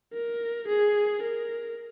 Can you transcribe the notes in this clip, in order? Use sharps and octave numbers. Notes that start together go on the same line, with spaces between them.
A#4
G#4
A#4